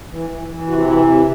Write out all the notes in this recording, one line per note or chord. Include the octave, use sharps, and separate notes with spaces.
E3
E3
E3
C3 F#4
E3 E4
C3 E4